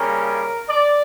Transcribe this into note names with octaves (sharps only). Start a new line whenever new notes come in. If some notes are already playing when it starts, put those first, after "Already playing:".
Already playing: C#3 G3 A#3 C#4 A#4
D5